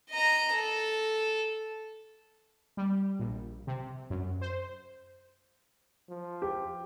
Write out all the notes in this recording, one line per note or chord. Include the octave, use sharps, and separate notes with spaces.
D#5 A#5
A4
G3
A#1
C3
F#2
C5
F3
G4